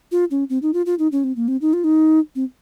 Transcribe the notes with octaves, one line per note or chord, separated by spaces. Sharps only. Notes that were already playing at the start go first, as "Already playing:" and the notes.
F4
C#4
C4
D#4
F4
F4
D#4
C#4
C4
A#3
C4
D#4
F4
D#4
C4